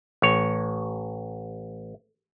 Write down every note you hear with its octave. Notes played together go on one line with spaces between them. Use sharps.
A1 C#5